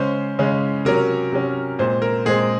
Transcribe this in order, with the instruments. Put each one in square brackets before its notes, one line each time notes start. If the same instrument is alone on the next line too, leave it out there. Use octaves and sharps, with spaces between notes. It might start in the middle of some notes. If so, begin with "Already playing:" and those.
Already playing: [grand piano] C#3 G#3 C#4 C5
C#3 G#3 C#4
C3 F#3 C#4 A#4
C3 F#3 C#4
A#2 G#3 C4 C5
A#4
A#2 G#3 C4 G#4